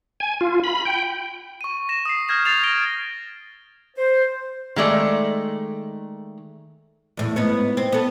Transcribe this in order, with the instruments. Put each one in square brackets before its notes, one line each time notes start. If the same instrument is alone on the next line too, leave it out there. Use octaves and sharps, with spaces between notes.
[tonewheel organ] G#5
F4
B5
G5
[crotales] C#6 D#7
A#6 E7
D#6 C7
F6 G6 G#6 A#6 E7
A6 C7 F7
A#6 D7 G7
[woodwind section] C5
[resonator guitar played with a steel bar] D#3 G#3 A3 D5
[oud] E2 A2
G#2 B3 C#5
C4
B3 A4